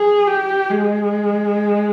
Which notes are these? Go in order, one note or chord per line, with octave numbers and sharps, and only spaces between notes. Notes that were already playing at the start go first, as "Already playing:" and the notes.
Already playing: G#4
G4
G#3